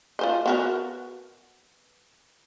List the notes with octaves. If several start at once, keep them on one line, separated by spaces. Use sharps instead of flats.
F4 C5 D#5
B3 F#4 A#4